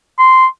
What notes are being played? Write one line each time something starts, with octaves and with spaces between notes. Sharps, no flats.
C6